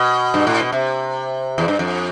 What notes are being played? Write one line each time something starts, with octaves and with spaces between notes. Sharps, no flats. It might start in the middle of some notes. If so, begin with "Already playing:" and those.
Already playing: B2
G2
A2
B2
C3
E2
G2
F2